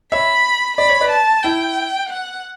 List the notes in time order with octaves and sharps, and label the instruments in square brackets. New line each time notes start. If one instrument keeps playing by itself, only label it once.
[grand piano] C#5 E5 [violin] B5
[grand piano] D5 [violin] B5
[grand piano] C#5
B4 D5
[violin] A5
[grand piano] E4 [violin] G5
[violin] F#5